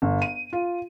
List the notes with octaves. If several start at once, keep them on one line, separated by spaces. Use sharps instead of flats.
G1
D#7
F4